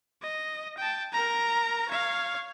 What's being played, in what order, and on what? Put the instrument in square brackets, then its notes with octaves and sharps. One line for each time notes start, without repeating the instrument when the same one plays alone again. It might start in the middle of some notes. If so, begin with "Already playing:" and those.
[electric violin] D#5
G5 A5
A#4 A#5
C#5 F5